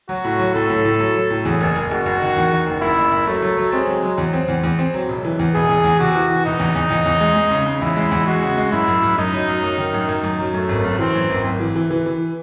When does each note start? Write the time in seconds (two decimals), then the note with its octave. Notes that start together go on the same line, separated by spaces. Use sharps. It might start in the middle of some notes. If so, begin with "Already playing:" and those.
0.09 F#3 F#4
0.24 A2
0.39 F#3
0.54 A2 A4
0.70 A2
0.85 A2
0.99 F#3
1.15 F#3
1.30 A2
1.45 E2 G#4
1.60 F#1
1.75 F#1
1.91 F#1 F#4
2.06 F#1
2.21 D#3
2.36 E2
2.52 D#3
2.67 F#1
2.81 F#1 E4
2.97 F#1
3.12 F#1
3.27 F#3 A3
3.42 F#3
3.57 F#3
3.72 G#3 C4
3.87 F#3
4.03 F#3
4.18 E2
4.33 C4
4.48 E2
4.63 E2
4.79 C4
4.94 F#3
5.09 E1
5.24 E3
5.39 E2
5.54 E1 G#4
5.69 E2
5.84 E2
5.99 C3 F#4
6.15 E3
6.30 E3
6.45 E1 D#4
6.60 E2
6.75 E2
6.90 E2
7.06 E2
7.20 G#3
7.36 G#3
7.51 C#3
7.66 C#3
7.81 E2 E4
7.96 G#3
8.11 E2
8.27 G#3 F#4
8.42 C#3
8.57 G#3
8.72 F#2 E4
8.87 F#2
9.03 F#2
9.18 F#2 D#4
9.33 F#3
9.48 F#2
9.63 F#2
9.78 D#3
9.94 F#2
10.08 F#2
10.24 F#2
10.39 F#3
10.54 F#2 A3
10.69 G#1
10.84 F#2
10.99 E3 C4
11.15 F#2
11.30 G#1
11.44 G#1
11.60 E3
11.76 E3
11.90 E3
12.06 E3